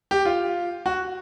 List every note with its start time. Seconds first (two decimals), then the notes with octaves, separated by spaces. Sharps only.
0.11 G4
0.25 F4
0.86 F#4